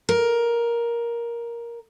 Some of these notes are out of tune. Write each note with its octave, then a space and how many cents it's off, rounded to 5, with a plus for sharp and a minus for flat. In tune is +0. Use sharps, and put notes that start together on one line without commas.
A#4 +10